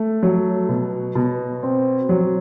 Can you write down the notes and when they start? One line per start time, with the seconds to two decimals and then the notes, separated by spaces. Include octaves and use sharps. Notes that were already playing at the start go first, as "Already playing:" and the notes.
Already playing: A3
0.23 F#3
0.69 B2
1.15 B2
1.63 C4
2.09 F#3